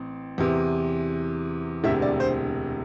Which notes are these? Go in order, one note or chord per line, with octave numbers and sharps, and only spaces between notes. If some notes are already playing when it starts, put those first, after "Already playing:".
Already playing: A1 C4
E2 C3 E3
E1 D2 C3 E5
D5
C5